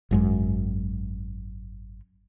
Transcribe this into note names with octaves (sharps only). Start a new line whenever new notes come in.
G#1 F#2 G#3